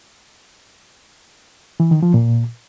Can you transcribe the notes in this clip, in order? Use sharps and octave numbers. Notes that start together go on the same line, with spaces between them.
E3
D#3
F3
A#2